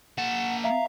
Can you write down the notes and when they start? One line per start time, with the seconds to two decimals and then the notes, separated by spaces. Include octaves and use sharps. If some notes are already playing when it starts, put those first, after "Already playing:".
0.18 A#3 F#5 A5
0.64 E5 F5 A#5